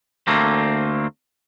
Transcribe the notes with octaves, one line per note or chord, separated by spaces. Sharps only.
D2 A3 A#3 C4